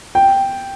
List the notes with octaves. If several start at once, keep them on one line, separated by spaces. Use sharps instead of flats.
G5